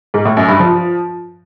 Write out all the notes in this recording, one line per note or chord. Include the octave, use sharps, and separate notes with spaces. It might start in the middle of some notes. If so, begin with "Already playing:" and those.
G#2
A2
F#2
G2
F3